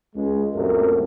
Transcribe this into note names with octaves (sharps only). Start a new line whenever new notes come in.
C#2 G#3
C2 F#2 A#2 A3 A#4